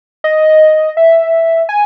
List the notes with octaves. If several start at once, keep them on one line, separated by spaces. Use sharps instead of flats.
D#5
E5
G#5